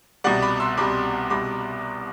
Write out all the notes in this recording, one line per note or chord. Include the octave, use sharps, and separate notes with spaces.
C2 B2 G3 D5 F#5
B5 D6
C6 E6
C2 B2 G3 B5 D6
C2 B2 G3 B5 D6